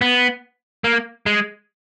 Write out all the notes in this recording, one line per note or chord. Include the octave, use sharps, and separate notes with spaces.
B3
A#3
G#3